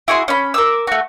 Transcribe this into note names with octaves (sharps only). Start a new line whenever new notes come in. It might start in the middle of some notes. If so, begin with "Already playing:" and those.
E4 F#4 G#4 C6
C#4 B5
A#4 D6 E6
A3 F#4